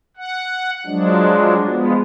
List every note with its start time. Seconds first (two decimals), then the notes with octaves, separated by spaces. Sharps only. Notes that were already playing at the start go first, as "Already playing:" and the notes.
0.17 F#5
0.86 F3 F#3 G#3 D4
1.66 F3 G#3 B3